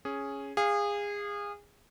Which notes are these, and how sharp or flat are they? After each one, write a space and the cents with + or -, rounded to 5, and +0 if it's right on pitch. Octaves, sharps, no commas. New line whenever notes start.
C#4 +0 G#4 +0
G#4 -25 F5 +0